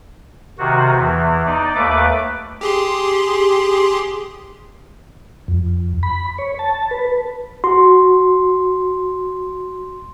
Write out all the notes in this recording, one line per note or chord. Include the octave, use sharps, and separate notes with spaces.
C3 D#3 F#4
E2 E3
D#4 D5
D#2 A3 B4 D6
G4 G#4 C6
F2
B5
C#5
A5
B4
F#4 C6